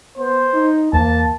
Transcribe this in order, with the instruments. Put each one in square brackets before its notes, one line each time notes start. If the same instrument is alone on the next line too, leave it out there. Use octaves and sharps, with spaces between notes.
[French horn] B3 [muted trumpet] C5
[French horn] D#4
[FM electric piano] E2 [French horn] A#3 [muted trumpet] A5